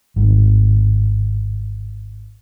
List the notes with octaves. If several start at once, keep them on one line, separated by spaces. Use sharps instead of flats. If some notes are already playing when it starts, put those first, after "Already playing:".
G#1 A2 C3 D#3